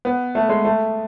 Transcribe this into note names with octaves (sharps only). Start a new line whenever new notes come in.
B3
A3
G#3
A3